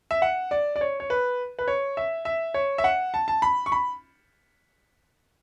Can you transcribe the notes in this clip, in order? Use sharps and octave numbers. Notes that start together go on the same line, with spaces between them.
E5
F#5
D5
D5
C#5
C#5
B4
B4
C#5
E5
E5
C#5
E5
F#5
A5
A5
B5
C#6
B5